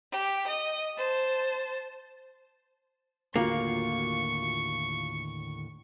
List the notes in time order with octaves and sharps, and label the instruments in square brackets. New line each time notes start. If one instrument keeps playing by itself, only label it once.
[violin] G4
D#5
C5 A5
[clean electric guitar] D#2 A2 D3 [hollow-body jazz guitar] A#3 [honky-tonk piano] F4 F#4 [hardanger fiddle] C#6